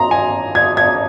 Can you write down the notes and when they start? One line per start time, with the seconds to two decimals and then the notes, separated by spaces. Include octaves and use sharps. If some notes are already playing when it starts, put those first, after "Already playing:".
Already playing: A#5 C6
0.11 G#5
0.55 G#6
0.77 G#6